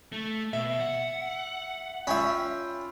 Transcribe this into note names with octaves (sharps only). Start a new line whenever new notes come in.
A3
B2 E5
F#5
C#4 F4 E5 G5 B5